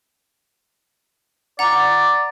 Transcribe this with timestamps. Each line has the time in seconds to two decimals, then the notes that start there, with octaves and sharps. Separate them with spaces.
1.59 D5 F#5 A#5